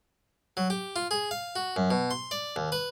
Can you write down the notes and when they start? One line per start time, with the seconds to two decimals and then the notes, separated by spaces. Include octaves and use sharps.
0.57 F#3
0.70 G4
0.96 F4
1.11 G#4
1.31 F5
1.56 F#4
1.76 F#2
1.91 B2
2.11 C6
2.31 D5
2.56 D#2
2.72 B4